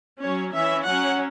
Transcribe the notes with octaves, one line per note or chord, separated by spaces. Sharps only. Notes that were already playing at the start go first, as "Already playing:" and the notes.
F#3 C#4 C#5
E3 C#4 E5
F#3 C#4 F#5